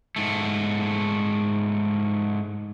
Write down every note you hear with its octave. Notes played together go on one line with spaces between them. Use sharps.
G#2 A3